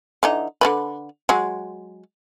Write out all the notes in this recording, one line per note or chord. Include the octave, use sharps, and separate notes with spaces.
D3 E3 D#4
D3 G3 B4
F#3 G#3